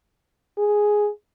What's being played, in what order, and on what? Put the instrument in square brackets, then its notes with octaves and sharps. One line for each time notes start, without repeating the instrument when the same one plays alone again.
[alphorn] G#4